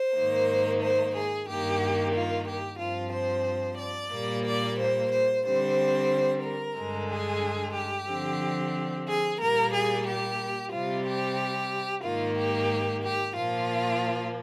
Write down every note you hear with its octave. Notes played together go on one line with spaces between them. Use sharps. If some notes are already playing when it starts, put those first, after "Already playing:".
Already playing: C5
G#2 D#3 A#3
C5
G#4
G2 D#3 A#3 G4
F4
G4
G2 F3 C4 F4
C5
D5
A#2 G3 A#3
D5
C5
C5
D3 G3 C4 C5
A#4
G2 D3 G#3
G#4
G4
D3 F3 C4
G#4
A#2 G3 A#3 A#4
G#4
G4
C3 G3 C4 F4
G4
G#2 D#3 A#3 F4
G4
G4
A#2 F3 A#3 F4